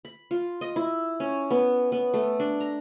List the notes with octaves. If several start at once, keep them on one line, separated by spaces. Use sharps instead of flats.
B5
F4
D#5
E4
C#4
B3
B3
A3
D4
A#5